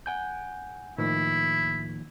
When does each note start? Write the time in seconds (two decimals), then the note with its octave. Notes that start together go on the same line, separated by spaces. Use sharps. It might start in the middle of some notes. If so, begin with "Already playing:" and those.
0.06 F#5 G#5 G6
0.98 A2 D#3 F3 A#3 E4